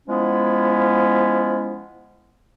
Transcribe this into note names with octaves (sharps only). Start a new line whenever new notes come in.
F3 G#3 B3 C#4 E4